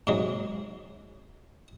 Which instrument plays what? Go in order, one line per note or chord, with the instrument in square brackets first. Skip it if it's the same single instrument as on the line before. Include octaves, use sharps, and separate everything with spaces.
[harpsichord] G#2 C3 F#3 G#3